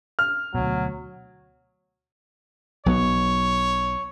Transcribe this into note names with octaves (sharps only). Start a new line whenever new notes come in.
F6
D2 B2 F#3
B1 F#3 B3 C#5